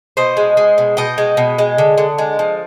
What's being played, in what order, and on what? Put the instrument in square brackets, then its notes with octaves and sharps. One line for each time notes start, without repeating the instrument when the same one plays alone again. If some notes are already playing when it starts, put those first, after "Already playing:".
[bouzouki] B2 C5 D#5
G#3
G#3
B2
B2 D#5 G5
G#3
B2
G#3
D3
D3
G#3
F3